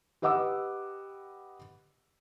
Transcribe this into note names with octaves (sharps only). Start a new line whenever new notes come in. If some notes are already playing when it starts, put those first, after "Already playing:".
G4 B4 D#5 F#5 D6 E6